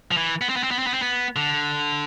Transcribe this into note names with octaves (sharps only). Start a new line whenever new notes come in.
F3
E3
B3
C4
B3
C4
B3
C4
B3
C4
B3
D3